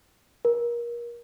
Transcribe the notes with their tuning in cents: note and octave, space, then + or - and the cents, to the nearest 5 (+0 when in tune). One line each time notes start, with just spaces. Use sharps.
A#4 +25